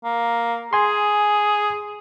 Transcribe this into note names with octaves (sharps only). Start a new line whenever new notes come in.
A#3
G#4 G#5 C6